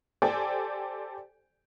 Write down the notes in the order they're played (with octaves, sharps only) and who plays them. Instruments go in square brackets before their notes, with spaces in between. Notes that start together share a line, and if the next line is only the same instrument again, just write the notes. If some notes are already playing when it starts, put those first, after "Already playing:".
[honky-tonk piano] G4 A4 C5 D5 G5 G#5